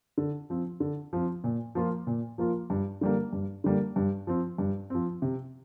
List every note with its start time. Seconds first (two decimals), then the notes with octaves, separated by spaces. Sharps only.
0.18 D3
0.50 F3 C4
0.80 D3
1.13 F3 C4
1.44 A#2
1.75 F3 A#3 F4
2.07 A#2
2.38 F3 A#3 F4
2.70 G2
3.01 D3 G3 A#3
3.33 G2
3.64 D3 G3 A#3
3.96 G2
4.27 F3 C4
4.58 G2
4.90 F3 C4
5.22 C3